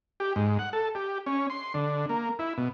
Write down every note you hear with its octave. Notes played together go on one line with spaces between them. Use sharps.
G4
G#2
F#5
A4
G4
C#4
C6
D3
A#3
E4
B2